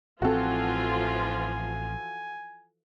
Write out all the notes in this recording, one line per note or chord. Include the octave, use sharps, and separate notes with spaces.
A1 E3 F3 C4 F4 F#4 A4 G#5